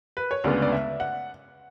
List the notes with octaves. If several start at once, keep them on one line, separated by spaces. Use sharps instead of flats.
B4
C#5
D2 C#3 G#3 B3 D5
D5
E5
F#5